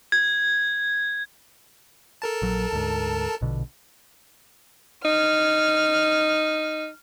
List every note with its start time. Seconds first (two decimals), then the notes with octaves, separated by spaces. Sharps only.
0.12 G#6
2.22 A4 A#4 A5
2.42 A#1 F#3
2.72 D2 G#2
3.41 A#1 B2 D3
5.05 D#4 F6